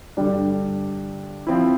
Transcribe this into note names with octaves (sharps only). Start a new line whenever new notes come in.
G2 D3 G3 D4
F3 C4 E4